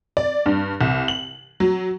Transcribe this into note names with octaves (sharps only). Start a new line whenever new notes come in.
D5
G2
C2
F#7
F#3